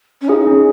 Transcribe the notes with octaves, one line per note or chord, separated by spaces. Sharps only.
C#4
D#4 F4 G#4
C#4